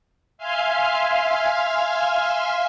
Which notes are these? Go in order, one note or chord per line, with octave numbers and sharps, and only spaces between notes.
E5 F5 G#5 C6 F6